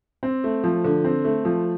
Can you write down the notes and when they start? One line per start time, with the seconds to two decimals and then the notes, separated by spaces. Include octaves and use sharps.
0.23 C4
0.44 A3
0.64 F3
0.84 D3
1.04 C4
1.25 A3
1.45 F3